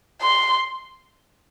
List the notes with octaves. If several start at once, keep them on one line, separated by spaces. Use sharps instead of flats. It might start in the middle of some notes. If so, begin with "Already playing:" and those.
C6